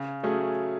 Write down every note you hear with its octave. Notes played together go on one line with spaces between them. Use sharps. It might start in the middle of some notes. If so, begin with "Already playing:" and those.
Already playing: C#3
F#3 A3 C#4 G#4